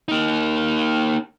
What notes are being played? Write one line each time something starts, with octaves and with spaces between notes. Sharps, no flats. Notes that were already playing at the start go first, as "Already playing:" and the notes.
A#3 D#4